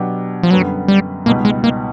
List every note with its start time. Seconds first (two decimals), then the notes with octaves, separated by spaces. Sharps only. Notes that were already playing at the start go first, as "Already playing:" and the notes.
Already playing: B2 F#3 B3 D4 G4
0.43 F3
0.51 F#2 D3 F#3 G3 B3
0.88 G3
1.26 C#2 B2 G3 A#3 B3 D#4
1.45 G#3
1.64 A#3